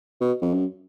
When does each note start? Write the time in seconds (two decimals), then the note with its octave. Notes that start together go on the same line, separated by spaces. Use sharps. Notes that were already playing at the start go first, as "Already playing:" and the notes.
0.21 B2
0.42 F2
0.54 F#2